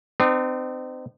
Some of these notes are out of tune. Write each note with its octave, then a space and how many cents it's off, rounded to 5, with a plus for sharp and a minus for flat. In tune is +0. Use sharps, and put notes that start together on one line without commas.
C4 -30 D#4 -40